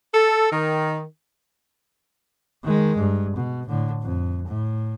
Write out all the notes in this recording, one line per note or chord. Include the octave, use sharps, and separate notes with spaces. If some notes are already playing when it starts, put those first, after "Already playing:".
A4
D#3
D#3 G#3
G2
B2
A2 D3
F2
A2